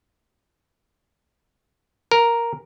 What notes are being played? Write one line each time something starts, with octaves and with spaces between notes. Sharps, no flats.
A#4